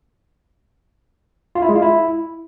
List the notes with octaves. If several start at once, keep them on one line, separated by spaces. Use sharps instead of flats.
F4
E4
G#3
F4
E4